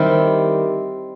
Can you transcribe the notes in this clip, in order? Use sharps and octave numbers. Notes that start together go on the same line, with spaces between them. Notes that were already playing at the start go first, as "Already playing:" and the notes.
Already playing: D#3 G3 C4 E4